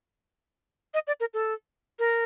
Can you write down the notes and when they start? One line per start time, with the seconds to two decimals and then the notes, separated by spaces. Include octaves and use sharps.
0.94 D#5
1.07 D5
1.20 A#4
1.34 A4
1.99 A#4